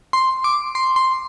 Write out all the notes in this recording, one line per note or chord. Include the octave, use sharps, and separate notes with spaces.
C6
D6
C6
C6